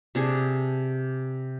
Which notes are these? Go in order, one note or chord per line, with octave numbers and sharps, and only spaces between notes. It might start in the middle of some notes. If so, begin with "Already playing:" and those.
C3 D4 G#4